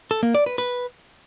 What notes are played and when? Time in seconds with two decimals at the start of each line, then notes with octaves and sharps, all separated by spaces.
0.11 A4
0.23 A#3
0.35 D5
0.46 B4
0.58 B4